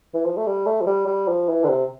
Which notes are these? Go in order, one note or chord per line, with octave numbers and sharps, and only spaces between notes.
E3
F3
A3
G3
A3
F3
G3
G3
F3
E3
D3
C3